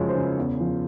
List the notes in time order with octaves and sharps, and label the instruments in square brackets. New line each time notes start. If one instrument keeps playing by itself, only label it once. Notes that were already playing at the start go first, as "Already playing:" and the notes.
Already playing: [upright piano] F#2 C#3 F3 G#3 C#5
C5
C#3
E2
F3